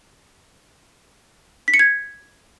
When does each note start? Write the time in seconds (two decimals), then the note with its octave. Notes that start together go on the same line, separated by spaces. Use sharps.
1.68 B6
1.74 C#7
1.79 G#6